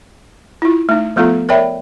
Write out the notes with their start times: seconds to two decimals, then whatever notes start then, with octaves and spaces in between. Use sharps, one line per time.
0.62 E4 F4
0.89 A3 D#4
1.16 F3 A3 B3 F4 A4 A#5
1.49 A#4 C#5 D5 E5 G5 B5